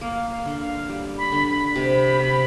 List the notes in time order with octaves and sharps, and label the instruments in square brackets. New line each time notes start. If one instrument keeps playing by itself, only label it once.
[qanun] A#3 [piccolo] F5
[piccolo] F5
[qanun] D3
[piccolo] F5
[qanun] G3
[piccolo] B5
[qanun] D3
[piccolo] B5
[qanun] C3
C3